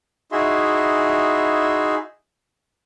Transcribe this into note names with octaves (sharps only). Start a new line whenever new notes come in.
D#4 E4 F#4 G#4 E5 C6